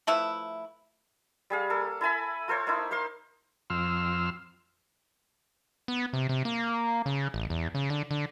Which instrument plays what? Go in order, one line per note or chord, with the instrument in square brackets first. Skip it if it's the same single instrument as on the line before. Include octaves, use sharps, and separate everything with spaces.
[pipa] F3 A3 E4 B4
[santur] G3 G#4 F5
A#3 A4
E4 A4 G#5 B5
F4 A4 C5 C#5
A#3 D#4 E4
A#3 C5 F5 C6
[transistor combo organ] F2 C6 E6 F6
[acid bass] B3
C3
C3
A#3
C#3
A1
E2
C#3
D3
D3